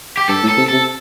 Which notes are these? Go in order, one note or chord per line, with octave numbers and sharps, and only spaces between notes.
G4
G2 A4
A2
A4
C3
C3 A4